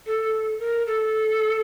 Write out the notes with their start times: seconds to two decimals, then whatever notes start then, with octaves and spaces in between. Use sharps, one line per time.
0.06 A4
0.59 A#4
0.87 A4